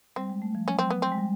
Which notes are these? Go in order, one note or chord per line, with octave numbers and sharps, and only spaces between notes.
G3 C4
G#3
A3
F3
F#3 C#4
C4
B3
C4
G#3
G3